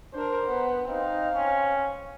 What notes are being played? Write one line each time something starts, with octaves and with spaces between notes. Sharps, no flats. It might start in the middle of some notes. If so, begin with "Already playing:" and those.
D4 A#4 C5
B3
C4 D#4 F5
C#4